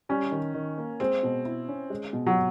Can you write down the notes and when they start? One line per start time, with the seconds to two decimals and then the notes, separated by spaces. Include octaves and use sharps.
0.09 G3 C#4
0.31 D#3
0.54 D#3
0.78 A#3
1.00 G#3 C4
1.23 B2
1.45 E4
1.69 C#4
1.90 G#3
2.13 B2
2.26 F#3